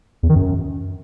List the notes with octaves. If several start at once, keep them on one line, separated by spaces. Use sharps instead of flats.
E2
D#3
F#2